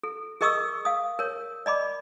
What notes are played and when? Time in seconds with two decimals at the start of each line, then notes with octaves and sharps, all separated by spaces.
0.04 A4
0.41 G#4 A#4 D#5 C#6 D#6 E6
0.85 F5 D#6
1.19 A#4 C#5
1.66 D5 D#5 B5 D6